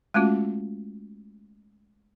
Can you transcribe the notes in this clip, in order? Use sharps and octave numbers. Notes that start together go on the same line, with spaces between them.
G#3 A3 C#4 F4 F#4